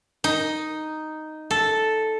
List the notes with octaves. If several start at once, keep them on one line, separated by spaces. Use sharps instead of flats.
D#4
A4